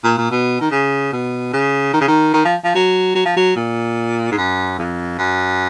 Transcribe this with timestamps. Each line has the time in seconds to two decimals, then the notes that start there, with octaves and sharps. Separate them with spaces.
0.04 A#2
0.18 A#2
0.31 B2
0.61 D#3
0.71 C#3
1.13 B2
1.53 C#3
1.93 D#3
2.01 C#3
2.08 D#3
2.34 D#3
2.45 F3
2.65 F3
2.75 F#3
3.15 F#3
3.25 F3
3.37 F#3
3.56 A#2
4.32 G#2
4.37 F#2
4.79 F2
5.18 F#2